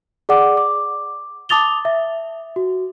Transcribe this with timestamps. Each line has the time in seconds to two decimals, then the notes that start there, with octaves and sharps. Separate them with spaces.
0.29 G#4 D5 F#5 D6
0.57 D6
1.49 A5 D6 D#6 A6 F7 G7
1.85 E5
2.56 F#4